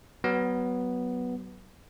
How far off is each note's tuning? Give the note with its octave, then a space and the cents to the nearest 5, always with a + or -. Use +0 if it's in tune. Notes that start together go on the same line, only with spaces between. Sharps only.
F#3 +25 B3 +0